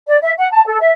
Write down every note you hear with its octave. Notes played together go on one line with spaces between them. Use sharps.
D5
E5
F#5
A5
A4
E5